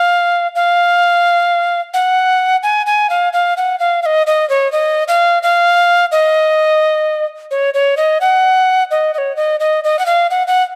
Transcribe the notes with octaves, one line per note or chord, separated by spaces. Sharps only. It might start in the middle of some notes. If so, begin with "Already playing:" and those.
Already playing: F5
F5
F#5
G#5
G#5
F5
F5
F#5
F5
F5
D#5
D#5
C#5
D#5
F5
F5
D#5
C#5
C#5
D#5
F#5
D#5
D#5
C#5
D#5
D#5
D#5
F#5
F5
F#5
F#5